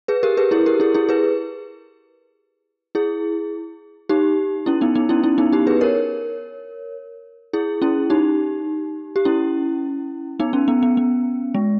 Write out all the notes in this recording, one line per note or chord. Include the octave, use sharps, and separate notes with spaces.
G#4 B4
G4 A#4
G#4 B4
E4 G#4
G4 A#4
E4 G#4
E4 G#4
G#4 B4
E4 G#4
D#4 G4
C#4 E4
B3 D#4
B3 D#4
C#4 E4
C#4 E4
B3 D#4
D#4 G4
G#4 B4
A#4 C#5
E4 G#4
C#4 E4
D#4 G4
G4
C#4 E4
B3 D#4
C#4
B3
B3
B3
G#3